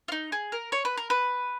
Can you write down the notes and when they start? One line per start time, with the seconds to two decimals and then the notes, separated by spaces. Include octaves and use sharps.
0.08 F4
0.12 D#4
0.32 G#4
0.52 A#4
0.72 C#5
0.85 B4
0.97 A#4
1.10 B4